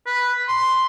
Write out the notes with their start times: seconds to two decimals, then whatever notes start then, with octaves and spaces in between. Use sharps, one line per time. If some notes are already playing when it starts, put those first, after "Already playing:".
0.07 B4
0.48 C6